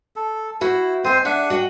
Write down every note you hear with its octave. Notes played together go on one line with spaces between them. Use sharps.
A4
E4 F#4 C5 E5
C4 C5 D#5 G#5
D4 G#4 E5 F#5
F#4 D#5 G5